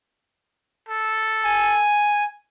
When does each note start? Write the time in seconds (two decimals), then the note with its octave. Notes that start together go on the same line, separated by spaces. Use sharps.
0.89 A4
1.45 G#5